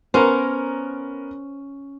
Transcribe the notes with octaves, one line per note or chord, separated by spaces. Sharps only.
B3 C#4 A#4 C5